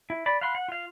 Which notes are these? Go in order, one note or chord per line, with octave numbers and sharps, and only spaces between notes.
E4
D5 B5
F5 F#5 B5 C6
F#5
F4 F5